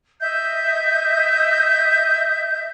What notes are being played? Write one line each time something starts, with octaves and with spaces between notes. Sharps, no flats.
D#5 E5 G6